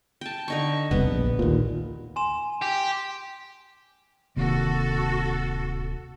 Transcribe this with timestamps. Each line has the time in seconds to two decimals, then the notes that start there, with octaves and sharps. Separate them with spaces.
0.21 G5 A5
0.48 D3 D#4 C#6
0.91 E1 C2 B3
1.07 A#1
1.39 D#2 A#2
2.16 G#5 C6 E7
2.62 G4
4.36 D1 C3 D#3 A#3 F#4 A4